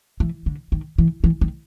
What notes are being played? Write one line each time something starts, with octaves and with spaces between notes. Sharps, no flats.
E3
D3
D#3
E3
E3
D#3